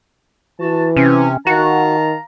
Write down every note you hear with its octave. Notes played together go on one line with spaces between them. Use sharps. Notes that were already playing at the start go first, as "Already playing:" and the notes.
E3 F#4 A5
C3 C#4
D#3 F#4 F5 A5 A#5